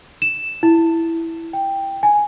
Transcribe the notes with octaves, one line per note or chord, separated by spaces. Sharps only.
E7
E4
G5
G#5